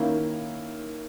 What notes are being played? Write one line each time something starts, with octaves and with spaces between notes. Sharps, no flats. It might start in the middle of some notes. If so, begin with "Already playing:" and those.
Already playing: D#3 A#3 C#4 E4